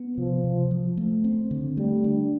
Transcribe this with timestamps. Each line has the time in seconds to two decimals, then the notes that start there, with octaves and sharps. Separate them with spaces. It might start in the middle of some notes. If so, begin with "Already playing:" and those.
Already playing: B3
0.17 C3 F3
0.44 C3
0.71 F3
0.97 A3
1.24 C4
1.51 D3
1.77 G3 A3
2.04 D4